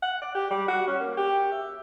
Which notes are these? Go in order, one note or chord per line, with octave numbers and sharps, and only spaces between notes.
F#5
D5
G4
G3
F#4
C#4
A#3
G4
E5